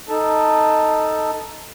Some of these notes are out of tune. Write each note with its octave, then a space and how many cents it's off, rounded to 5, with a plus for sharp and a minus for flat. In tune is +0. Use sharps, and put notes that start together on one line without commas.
D#4 +0 A4 +5 A5 +5